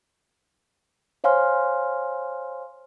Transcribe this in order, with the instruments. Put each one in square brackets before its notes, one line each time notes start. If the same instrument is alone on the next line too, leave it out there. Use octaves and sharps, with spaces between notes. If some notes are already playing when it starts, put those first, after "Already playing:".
[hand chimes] C5 C#5 F5 G#5 C6 F6